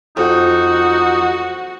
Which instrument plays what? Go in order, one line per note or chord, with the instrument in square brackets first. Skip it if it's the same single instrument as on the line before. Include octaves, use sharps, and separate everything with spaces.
[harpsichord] F2 [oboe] D#4 [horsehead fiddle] F#4